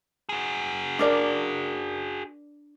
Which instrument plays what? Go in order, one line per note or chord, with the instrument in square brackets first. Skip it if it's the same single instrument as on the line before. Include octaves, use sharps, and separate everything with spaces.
[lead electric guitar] F#4 G#4
[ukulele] D4 A#4 D5